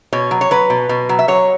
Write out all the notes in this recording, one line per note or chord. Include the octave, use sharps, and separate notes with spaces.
B2 C#5
F#3
C#5
F#3 B4
B2
B2
F#3
E5
F#3 C#5